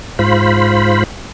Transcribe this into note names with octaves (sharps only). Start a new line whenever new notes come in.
G#2 F4 C5 B5